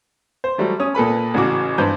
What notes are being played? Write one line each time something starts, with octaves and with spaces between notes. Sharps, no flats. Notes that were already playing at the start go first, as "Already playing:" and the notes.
C5
F#3 G3 A3
C#4 D#6
A#2 A4 B4 B5
A1 C#3 F#4 D6
G2 B4 C5 G6